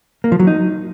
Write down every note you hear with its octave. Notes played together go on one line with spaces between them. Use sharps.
A#3
F3
F#3
D#4